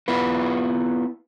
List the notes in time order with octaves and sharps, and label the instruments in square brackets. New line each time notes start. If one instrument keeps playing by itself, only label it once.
[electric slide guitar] B3 E4 F4 B4